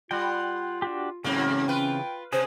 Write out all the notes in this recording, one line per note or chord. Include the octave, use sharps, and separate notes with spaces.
G3 F4 F#5 G5
D4 F#4 G4
G#2 C#3 E3 F#3 A#3 C4 C#4
F4 B4 G5
C3 G#4 C5